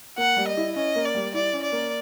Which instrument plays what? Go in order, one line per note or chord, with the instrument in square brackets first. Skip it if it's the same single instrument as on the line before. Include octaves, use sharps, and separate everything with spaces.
[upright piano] A#3 [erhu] F#5
[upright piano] G3
[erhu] D#5
[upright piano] E4
[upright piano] C#4 [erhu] D#5
[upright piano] A#3
[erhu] D5
[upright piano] G3
[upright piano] E4 [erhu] D5
[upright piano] C#4
[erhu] D5
[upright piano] A#3